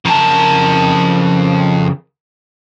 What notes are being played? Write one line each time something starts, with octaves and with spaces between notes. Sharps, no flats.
F2 C#3 A#4 A5